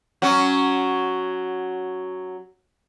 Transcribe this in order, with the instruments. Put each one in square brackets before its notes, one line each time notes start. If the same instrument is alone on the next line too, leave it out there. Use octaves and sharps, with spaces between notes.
[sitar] F#3 C#4